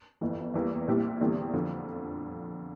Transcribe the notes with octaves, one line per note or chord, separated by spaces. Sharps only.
G1 F2 E3
E2 E3 G3 A#3
A#1 A#2 G3 C4 E4
E2 D3 G3 C4 E4
F2 D3 F3